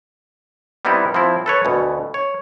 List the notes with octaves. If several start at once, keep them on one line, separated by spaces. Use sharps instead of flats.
G3 B3 C4 D#4 E4 G4
F3 C4 E4
A4 B4 C#5
D2 B2
C#5